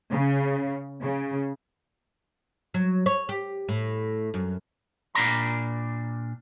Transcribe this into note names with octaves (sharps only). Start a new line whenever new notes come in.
C#3
C#3
F#3
C#5
G4
A2
F#2
A#2 D4 A#4 D5 A#5 B5